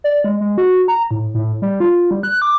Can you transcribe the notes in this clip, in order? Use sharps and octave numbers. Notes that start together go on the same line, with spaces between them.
D5
G#3
G#3
F#4
A#5
A2
A2
G3
F4
G3
F#6
D6